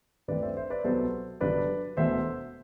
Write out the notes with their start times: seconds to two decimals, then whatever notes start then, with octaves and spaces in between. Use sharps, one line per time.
0.28 G2 E3 A3 C4 B4 D5
0.43 C5 E5
0.57 C5 E5
0.70 B4 D5
0.84 C2 B2 F#3 B3 A4 C5
1.41 G1 G2 D3 F#3 B4 D5
1.97 E1 E2 B2 A3 C5 E5